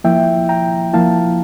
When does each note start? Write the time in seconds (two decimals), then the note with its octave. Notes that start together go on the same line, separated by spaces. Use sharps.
0.04 F3 A#3 E4 E5 G5
0.49 G5 A#5
0.93 F3 A#3 E4 F5 A5